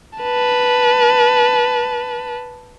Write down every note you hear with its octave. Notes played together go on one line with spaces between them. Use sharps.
B4 A5